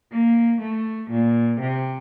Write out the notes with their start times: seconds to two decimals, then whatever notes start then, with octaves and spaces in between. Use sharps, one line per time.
0.11 A#3
0.61 A3
1.11 A#2
1.60 C3